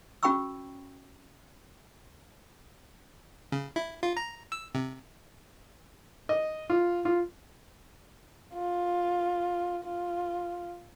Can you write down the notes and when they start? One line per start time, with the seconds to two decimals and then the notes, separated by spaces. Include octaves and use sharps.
0.23 C#4 F#4 G5 B5 C#6 E6
3.52 C#3
3.76 E4
4.03 F4
4.17 A#5
4.52 E6
4.75 C3
6.29 D#5
6.70 F4
7.05 F4
8.54 F4
9.84 F4